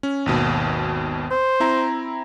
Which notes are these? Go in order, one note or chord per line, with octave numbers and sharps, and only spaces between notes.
C#4
G#1 D#2 B2
C5
C4 E4 A#5